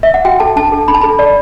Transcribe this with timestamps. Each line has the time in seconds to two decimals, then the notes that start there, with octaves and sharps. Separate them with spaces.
0.03 E5
0.14 F#5
0.25 F#4 G5
0.40 A4 A5
0.56 D4 A5
0.72 A4
0.88 D4 B5
0.95 A5
1.02 A4 B5
1.19 D5